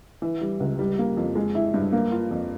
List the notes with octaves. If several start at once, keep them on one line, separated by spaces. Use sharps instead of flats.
E3
G3
C#2
G3
A#3
F2
G#3
E4
G2
A#3
F4
F2